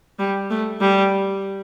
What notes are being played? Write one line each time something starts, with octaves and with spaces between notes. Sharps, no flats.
G3
A3
G3